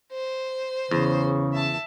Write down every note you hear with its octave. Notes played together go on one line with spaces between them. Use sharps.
C5
E2 C#3
E5 A5